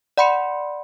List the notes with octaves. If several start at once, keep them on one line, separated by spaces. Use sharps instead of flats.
D5 F#5 B5 C6 C#7